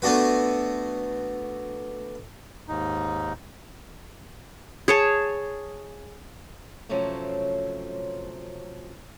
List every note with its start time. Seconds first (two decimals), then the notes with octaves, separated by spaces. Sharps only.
0.02 A3 B3 D4 F#4 B4
2.68 D#2 G#2 D#4
4.88 G#4 C#5 A5
6.89 C3 F3 F#3 A3 C4 C#4